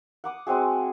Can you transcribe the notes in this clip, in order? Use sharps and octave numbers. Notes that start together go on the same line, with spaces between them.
F#5 D6 D#6
G#3 C4 F#4 G#4